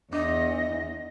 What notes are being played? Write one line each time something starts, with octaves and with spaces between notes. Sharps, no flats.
E2 D4 D#5